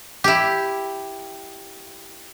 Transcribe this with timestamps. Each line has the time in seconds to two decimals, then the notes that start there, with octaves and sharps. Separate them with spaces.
0.24 E4 G4